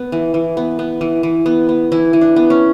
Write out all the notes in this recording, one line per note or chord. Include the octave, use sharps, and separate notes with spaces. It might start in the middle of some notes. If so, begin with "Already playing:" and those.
Already playing: B3
E3
E3
B3
B3
E3
E3
B3
B3
E3 E4
E3
D4
B3
C#4